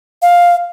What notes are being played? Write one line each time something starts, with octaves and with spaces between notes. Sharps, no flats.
F5